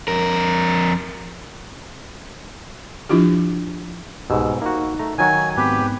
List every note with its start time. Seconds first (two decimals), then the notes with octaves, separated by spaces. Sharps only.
0.08 F2 A#4
3.09 F3 D4 E4 F4 G4
4.30 C2 G#2 B2 G4 E6
4.61 A#3 D#4 F#4
4.99 A3 A#5
5.18 D#3 F#3 F#4 G#5
5.57 G#2 B3 C4 G4 B4